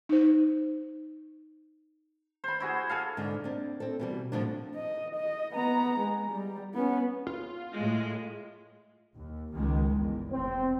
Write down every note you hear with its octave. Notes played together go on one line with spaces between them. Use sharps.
D#4 C5
C5 B5
E4 F#4 G#4
G#4 A4 F5
G#2 D3
C4 D4
C4 A4
B2 E3 G3
F2 A2 D3 F3 G3 D4
D#5
D#5
B3 A#5
G#3
G3
B3 C#4
F4
A2 G#3
D#2
C#2 D#3 G#3
G1 E2
F1 E2 C4